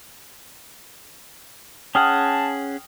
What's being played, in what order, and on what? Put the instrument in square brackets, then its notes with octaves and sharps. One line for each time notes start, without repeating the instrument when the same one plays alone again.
[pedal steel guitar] C#4 G#4 F#5 [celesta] G5 D#6 F6 [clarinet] A5